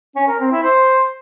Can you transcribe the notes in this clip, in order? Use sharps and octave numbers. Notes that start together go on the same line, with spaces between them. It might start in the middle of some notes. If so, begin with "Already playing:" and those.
C#4
A#4
C4
E4
C5